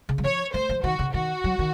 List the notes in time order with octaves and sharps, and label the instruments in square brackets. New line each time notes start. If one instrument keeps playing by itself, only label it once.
[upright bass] C#3
F#3
[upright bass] F3 [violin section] C#5
[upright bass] A3 [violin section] C5
[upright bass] F3
[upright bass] D#3 [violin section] F#4
[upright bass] C#3
[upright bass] D#3 [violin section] F#4
[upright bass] F#3
D#3